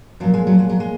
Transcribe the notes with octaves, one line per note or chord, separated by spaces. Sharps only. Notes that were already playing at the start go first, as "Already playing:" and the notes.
A#2 F3 F#3
G#3
F#3
G#3
F#3
G#3